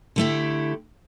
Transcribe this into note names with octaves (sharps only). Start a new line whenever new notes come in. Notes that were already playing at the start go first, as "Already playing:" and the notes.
D3 A3 E4 G4